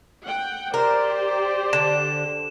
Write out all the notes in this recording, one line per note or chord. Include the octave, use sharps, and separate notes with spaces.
F#5 G5
G4 A#4 C5 D5
D3 E7